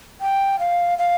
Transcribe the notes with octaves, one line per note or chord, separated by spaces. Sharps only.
G5
F5
F5